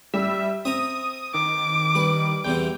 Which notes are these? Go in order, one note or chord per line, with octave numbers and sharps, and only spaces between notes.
G3 E5
C4 E5 A#5 D#6
D#3 D6
G3 B4
E2 C3 E3 G5